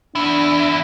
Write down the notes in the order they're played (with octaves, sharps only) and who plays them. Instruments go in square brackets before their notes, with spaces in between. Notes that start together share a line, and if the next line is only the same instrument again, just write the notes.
[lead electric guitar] E2 E4 [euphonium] D4